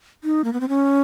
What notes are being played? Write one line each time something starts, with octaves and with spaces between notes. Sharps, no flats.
D#4
A#3
B3
C4
C#4